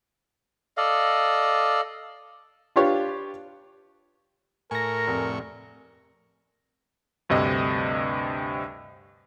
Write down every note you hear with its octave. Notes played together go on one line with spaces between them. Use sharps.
A4 D5 D#5 F5
D4 F4 G4 B4 C#5 F5
A2 A#4 G#5 C#6 A#6
F1
D2 G2 C3 D#5